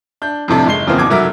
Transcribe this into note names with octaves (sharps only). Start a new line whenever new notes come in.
D4 G6
F2 A2 C3 D4
F#1 G#3 C7 G7
E2 C#3 E3 F3 A#3 C4
G#1 B2 D6 G#6
F1 F#3 A#4 E5 D6